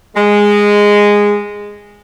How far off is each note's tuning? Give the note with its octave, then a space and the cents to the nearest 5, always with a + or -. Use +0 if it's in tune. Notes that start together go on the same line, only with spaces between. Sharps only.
G#3 -10